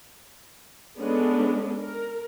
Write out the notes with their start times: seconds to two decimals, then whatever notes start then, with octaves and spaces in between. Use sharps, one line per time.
0.98 G#3 B3 C#4 D4 A4
1.81 A#4